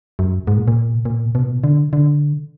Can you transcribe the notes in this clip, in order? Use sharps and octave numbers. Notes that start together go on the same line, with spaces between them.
F#2
G#2
A#2
A#2
A#2
B2
A#2
B2
D3
D3